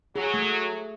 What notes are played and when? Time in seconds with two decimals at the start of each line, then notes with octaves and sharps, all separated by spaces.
0.16 F#3 G#4
0.34 A3